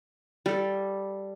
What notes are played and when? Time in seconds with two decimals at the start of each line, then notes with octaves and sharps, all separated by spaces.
0.46 G3 A4